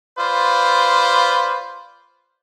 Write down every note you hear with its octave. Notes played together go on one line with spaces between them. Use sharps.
F4 B4 C5 D5